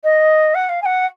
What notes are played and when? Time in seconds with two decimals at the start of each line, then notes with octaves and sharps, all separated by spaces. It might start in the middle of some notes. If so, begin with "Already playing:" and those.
0.03 D#5
0.54 F#5
0.69 F5
0.82 G#5
0.85 F#5